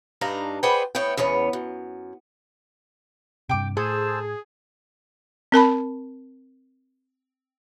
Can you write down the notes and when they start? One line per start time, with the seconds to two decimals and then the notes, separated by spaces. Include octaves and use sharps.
0.21 G2 D4 D#4 F5 A#5
0.63 G#4 B4 C5 D5 F#5 G5
0.95 A2 B3 C#5 G5
1.17 E2 C#3 B3 C#5
1.53 F#2
3.49 G2 C3 G5 D6
3.77 A2 G#4 A4 C5 A5 E6
5.52 C4 A#4 A5 B5